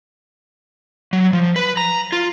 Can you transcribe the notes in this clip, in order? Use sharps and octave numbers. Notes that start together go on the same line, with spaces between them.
F#3
F3
B4
A#5
F4